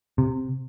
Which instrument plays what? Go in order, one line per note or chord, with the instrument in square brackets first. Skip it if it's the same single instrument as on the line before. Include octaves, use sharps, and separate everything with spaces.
[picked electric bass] C3